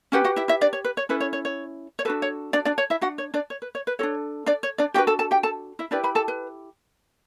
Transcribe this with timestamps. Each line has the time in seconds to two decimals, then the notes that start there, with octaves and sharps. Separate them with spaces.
0.12 C#4 F#4 G4 B4 F#5
0.24 F#4 F#5
0.36 E4 E5
0.48 E4 E5
0.61 D4 D5
0.73 C#5
0.85 B4
0.97 C#5
1.09 C#4 E4 A4 B4
1.21 C#5
1.33 C#5
1.45 C#5
1.99 C#5
2.05 D4 F#4 A4 B4
2.22 C#5
2.53 D4 D5
2.65 D4 D5
2.78 C#5
2.90 E4 E5
3.01 D4 F#4 F#5
3.18 C#5
3.34 D4 D5
3.50 C#5
3.62 B4
3.75 C#5
3.87 B4
3.99 F#4 A4 C#5
4.03 D4
4.46 D4 D5
4.63 C#5
4.78 D4 D5
4.94 D4 F#4 G4 B4 G5
5.07 A4 A5
5.19 A4 A5
5.31 G4 G5
5.43 A4 A5
5.79 E4 E5
5.91 D4 E4 G4 B4 D5
6.04 B4 B5
6.15 A4 A5
6.28 B4